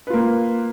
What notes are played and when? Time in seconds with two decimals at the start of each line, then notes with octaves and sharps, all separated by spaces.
0.07 B4
0.10 F4
0.13 A#3